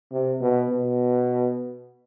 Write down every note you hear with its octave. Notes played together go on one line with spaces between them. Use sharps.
C3
B2
B2